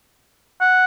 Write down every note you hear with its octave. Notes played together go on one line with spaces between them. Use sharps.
F#5